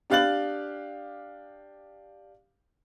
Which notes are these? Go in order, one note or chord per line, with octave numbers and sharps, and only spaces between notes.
D4 G4 F5 F#6 A6 F#7